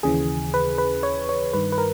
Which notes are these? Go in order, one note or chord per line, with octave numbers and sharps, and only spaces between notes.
D#2 C#3 E3 G#4
B4
B4
C#5
C#5
G2 D#3 B4
B4
A#4